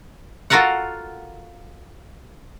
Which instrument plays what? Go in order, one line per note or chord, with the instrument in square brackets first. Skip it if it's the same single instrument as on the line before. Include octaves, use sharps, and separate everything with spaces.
[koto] F4 F#4 A4 A#4 F5 F#5